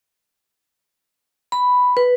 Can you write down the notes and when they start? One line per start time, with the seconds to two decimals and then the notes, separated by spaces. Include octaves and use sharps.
1.52 B5
1.97 B4